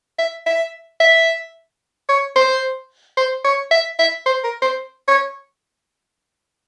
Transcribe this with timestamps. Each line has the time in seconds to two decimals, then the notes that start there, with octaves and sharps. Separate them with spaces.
0.19 E5
0.46 E5
1.00 E5
2.09 C#5
2.36 C5
3.17 C5
3.45 C#5
3.71 E5
3.99 E5
4.26 C5
4.44 A#4
4.62 C5
5.08 C#5